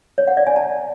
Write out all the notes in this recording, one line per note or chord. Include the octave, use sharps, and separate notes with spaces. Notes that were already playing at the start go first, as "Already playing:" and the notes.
C#5
F#5
D5
G#5
A5